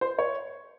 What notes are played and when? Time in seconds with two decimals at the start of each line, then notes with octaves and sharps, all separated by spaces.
0.01 C5
0.19 C#5